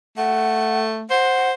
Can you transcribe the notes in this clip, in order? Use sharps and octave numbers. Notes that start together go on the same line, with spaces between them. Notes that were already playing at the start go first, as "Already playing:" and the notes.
A3 F#5
C5 F#5